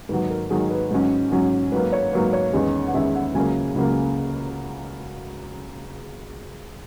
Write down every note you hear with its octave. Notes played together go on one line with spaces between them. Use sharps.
G#2 D#3 F#3 B4
A#4
G#2 D#3 F#3 G#4
B4
G#2 F#3 C#4
G#2 F#3 C#4
G#2 F#3 A#3 B4
C#5
G#2 F#3 A#3 B4
C#5
E2 D#3 G#3 C#4
F#5
E2 D#3 G#3 C#4 E5
F#5
C#2 C#3 F#3 A#3 G#5
C#2 C#3 F#3 A#3